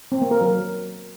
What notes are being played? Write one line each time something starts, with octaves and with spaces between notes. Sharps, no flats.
C4
A#3
A#4
F#3